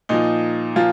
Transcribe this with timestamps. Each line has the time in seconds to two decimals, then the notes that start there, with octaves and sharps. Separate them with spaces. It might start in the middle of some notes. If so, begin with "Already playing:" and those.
0.09 A#2 F3 D#4
0.76 A#2 F3 F4